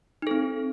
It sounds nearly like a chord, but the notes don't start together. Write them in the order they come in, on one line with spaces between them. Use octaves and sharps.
D#4 A4 C4